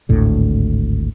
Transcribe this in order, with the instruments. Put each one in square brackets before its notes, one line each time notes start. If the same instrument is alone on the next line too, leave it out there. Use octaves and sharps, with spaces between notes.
[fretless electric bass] G#1 D2 A2 D3